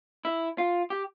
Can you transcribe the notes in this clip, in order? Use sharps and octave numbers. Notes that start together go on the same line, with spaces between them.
E4
F4
G4